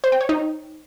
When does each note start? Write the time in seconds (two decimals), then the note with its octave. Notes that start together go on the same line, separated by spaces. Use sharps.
0.04 C5
0.12 G5
0.21 C#5
0.29 D#4